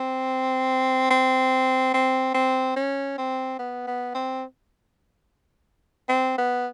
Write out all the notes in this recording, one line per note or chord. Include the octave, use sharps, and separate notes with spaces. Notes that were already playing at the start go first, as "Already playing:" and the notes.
Already playing: C4
C4
C4
C4
C#4
C4
B3
B3
C4
C4
B3